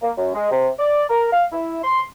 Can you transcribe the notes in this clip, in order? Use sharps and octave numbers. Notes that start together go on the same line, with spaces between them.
A#3
F#2
G#3
C3
D5
A#4
F5
E4
C6